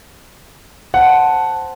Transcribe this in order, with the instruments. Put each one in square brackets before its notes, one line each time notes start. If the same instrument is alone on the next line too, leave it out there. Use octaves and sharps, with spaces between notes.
[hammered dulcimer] C5 A5 [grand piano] F#5